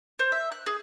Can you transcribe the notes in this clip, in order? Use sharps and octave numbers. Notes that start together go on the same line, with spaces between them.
C5
E5
F#6
G#4